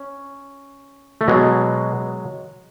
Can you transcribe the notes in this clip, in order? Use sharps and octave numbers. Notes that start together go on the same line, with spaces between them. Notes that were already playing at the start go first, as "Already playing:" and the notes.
Already playing: C#4
A3
B2 F#3 G#3